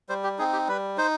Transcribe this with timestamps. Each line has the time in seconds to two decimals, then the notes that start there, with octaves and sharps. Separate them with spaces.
0.09 G3 C5
0.24 G4
0.38 C4 D#4 G#4
0.53 G4
0.68 G3 B4
0.98 D#4 C5